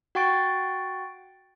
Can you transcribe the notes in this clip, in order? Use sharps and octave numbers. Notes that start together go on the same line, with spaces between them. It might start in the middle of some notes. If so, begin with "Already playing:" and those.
F#4 F#5 G5 C#6 A6 D7